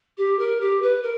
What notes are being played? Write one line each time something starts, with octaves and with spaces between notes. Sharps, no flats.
G4
A#4
G4
B4
A#4